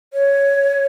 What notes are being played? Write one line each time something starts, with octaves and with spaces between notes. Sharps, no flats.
C#5